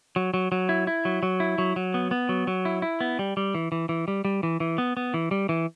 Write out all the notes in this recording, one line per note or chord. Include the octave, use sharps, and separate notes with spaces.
F#3
F#3
F#3
E4
E4
F#3
F#3
E4
F#3
F#3
B3
B3
F#3
F#3
E4
E4
B3
G3
G3
E3
E3
E3
G3
G3
E3
E3
B3
B3
E3
G3
E3